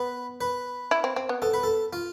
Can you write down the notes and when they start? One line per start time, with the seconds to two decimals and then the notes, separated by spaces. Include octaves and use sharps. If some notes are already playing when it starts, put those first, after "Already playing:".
Already playing: B3 B4
0.41 B4
0.91 E4
1.04 C4
1.16 C4
1.29 B3
1.42 B3 A4
1.54 B4
1.63 A4
1.93 F4